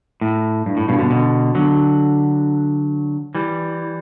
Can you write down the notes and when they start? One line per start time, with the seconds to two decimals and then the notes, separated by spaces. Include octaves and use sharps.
0.21 A2
0.66 G2
0.77 A2
0.88 G2 B2
0.99 B2 D3
1.10 B2 D3
1.55 D3 F#3
3.35 E3 G3